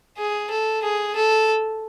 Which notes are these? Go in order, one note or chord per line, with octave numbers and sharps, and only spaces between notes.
G#4
A4
G#4
A4